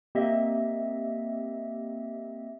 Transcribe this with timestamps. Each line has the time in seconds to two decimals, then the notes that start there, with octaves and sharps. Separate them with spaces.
0.15 A#3 C4 G4 D#5 E5